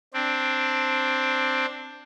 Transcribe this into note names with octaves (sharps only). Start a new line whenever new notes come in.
C4 D4